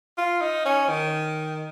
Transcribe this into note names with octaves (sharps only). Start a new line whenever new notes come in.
F4
D#4
C#4
D#3